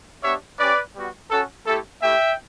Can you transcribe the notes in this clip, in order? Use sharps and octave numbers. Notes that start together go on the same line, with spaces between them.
B3 D4 G4 C#5 E5
C#4 G4 B4 D5
G3 B3 F#4
C#4 F#4 A4
A3 E4 G4 A4
A3 E4 G4 E5 G5